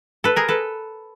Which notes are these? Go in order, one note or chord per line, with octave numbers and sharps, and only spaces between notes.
A4 B4
G#4 A#4
A4 B4